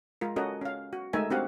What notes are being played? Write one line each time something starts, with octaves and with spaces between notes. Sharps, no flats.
G#3 F4 A#4
C#4 F#4 A4 A#4 D#5 F#5
C#4 F5
F#4
G#3 A3 D#4 A#4 E5 G#5
C4 D4 F#4 G4 F5 F#5